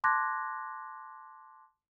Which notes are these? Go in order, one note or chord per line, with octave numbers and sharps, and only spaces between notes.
A5 C6 D6 F#6 G#6 A#6